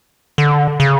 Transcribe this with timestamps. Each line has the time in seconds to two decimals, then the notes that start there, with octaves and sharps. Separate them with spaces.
0.38 D3
0.80 C#3